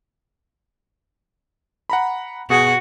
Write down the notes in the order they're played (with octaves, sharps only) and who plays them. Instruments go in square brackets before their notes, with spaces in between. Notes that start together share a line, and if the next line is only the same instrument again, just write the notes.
[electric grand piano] F#5 A#5 B5
[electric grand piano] B2 G#4 [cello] F#4